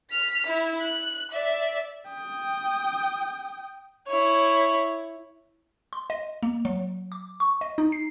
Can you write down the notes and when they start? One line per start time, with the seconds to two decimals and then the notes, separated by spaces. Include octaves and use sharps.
0.11 F6 B6
0.47 E4
0.80 F#6
1.31 D5 E5
2.10 G5 D#6
4.07 E4 C#5
5.93 C6
6.10 D#5
6.43 A#3
6.65 F#3
7.12 D6
7.40 C#6
7.61 D#5
7.78 D#4
7.92 C7